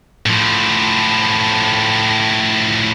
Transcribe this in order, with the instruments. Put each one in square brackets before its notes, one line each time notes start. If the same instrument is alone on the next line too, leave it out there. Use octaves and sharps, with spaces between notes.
[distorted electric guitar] A2 F3